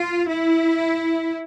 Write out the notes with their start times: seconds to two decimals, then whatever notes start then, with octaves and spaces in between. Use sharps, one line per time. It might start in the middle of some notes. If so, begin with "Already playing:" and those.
Already playing: F4
0.29 E4